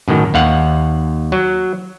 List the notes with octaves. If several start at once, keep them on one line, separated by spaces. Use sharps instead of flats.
F#2 A2 D#3
D#2 F5 F#5
F#3